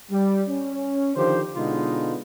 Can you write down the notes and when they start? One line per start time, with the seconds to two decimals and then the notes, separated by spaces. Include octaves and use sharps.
0.10 G3
0.48 C#4
1.16 D3 D#3 F3 G4 C5
1.56 B2 D3 G#3 B3 D#4 F4